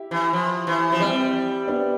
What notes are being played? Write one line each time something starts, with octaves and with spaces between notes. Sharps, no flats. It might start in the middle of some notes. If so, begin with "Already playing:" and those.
Already playing: E4 G4
E3
F3
E3
F3
G3 C4 E4
B3 D4